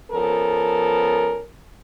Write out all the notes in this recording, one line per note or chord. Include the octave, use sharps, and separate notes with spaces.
F3 B3 C#4 A4 A#4